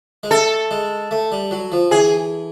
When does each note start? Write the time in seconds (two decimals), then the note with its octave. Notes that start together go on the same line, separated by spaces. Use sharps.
0.23 G#3
0.31 A3 A4
0.71 G#3
1.11 A3
1.32 G3
1.51 F#3
1.72 F3
1.91 E3 G#4